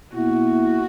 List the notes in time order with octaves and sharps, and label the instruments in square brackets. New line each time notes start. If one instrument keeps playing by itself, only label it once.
[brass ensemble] B2 A#3 E4 [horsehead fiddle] F#4